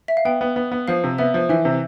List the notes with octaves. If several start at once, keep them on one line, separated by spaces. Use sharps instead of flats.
E5
F5
B3 G5
B3
B3
B3
F3 F5
C3
B3 E5
F3
E3 E5
C3